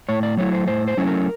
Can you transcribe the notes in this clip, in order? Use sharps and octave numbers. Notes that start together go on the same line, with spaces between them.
A2 C#5
D5
F#3 A3 C#4 E4 C#5
C5
A2 C5
C5
F#3 A3 C#4 E4
A#4